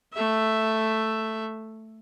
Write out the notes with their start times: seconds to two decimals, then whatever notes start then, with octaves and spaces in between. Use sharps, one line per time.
0.13 A3 E5